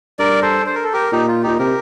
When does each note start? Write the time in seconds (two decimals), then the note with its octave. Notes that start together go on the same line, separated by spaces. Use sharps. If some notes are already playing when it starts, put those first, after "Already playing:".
0.19 G2 A#4 D5
0.42 A4 C5
0.66 C5
0.75 A#4
0.84 A4
0.93 G4 A#4
1.12 A#2 D#4 G4
1.28 F4
1.43 A#2 D#4 G4
1.59 C3 G4 A#4